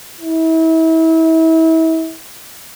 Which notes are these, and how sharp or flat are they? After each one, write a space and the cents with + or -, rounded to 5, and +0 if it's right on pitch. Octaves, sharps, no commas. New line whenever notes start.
E4 -35